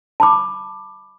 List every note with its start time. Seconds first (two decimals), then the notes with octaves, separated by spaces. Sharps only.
0.20 A5 B5 D6